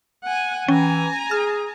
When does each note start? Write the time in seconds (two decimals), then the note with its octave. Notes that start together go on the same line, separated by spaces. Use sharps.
0.23 F#5 G#5
0.68 E3 C#4 G5 G#5 A#5
1.31 G#4 F6